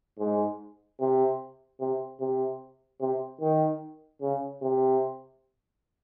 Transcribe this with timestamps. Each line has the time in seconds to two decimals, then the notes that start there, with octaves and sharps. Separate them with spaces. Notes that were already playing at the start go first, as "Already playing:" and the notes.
0.19 G#2
1.00 C3
1.80 C3
2.20 C3
3.01 C3
3.42 D#3
4.22 C#3
4.62 C3